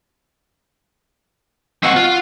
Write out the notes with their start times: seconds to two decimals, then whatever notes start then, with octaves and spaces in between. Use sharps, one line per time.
1.83 C4 D#5 F#5 C#6 E6
1.96 F4